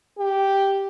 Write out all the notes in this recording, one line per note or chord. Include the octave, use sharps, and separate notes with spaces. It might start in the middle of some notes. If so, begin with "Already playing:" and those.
G4